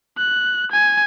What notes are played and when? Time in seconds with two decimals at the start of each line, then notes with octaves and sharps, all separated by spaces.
0.18 F#6
0.72 G#5